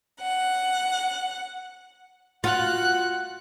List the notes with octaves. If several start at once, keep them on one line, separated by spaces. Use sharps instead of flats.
F#5
F4 F#4 F#5 F#6